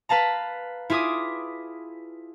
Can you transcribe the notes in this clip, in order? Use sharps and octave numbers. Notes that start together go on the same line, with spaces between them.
B4 F5 A5 A#5
E4 F4 G#4 D6 D#6